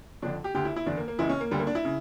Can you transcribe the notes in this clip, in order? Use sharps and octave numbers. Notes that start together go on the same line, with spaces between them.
F2 D3 D4
G4
D2 D3 G4
E4
E4
E2 D3 D4
A#3
A#3
C#2 C#3 E3 E4
C#4
A#3
D2 D3 G3
A#3
D4
E4
C#3